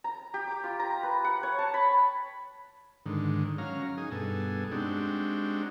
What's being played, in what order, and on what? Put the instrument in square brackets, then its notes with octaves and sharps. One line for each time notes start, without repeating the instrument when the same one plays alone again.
[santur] A#5
G4
D6
F4
A#5
B4
F#5
C#5
A5
B5
[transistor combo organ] G#2 D3 D#3
F#3 C#4 F5 A#5
D#4 G#4
G2 B2 G#4 A4
G#3 C4 D4 D#4 F#4 G4